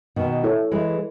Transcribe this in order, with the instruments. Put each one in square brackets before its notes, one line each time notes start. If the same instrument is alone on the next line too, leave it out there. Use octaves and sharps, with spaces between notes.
[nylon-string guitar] B2 D#3
[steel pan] E4 A4 C#5 E5
[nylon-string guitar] E3 G#3